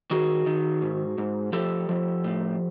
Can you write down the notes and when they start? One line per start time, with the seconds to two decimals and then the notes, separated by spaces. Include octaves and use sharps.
0.11 D#3 F#4 G#4
0.46 D#3
0.82 G#2
1.18 G#2
1.53 F3 G4 A4
1.89 F3
2.24 A2